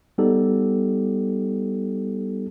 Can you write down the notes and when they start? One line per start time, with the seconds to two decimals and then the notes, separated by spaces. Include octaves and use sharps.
0.18 G3 B3 D#4 G4 A4